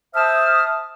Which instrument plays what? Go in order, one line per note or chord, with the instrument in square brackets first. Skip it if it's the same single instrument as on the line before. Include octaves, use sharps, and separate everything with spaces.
[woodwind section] C5 E5 A5 D#6 F6